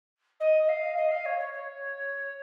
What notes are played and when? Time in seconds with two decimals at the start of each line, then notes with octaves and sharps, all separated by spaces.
0.40 D#5
0.68 F5
0.96 D#5
1.11 F5
1.25 C#5
1.39 C#5
1.53 C#5